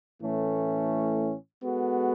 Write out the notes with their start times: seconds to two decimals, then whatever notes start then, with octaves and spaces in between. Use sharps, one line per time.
0.21 A2 E3 A3 C#4
1.63 G#3 B3 F#4 A4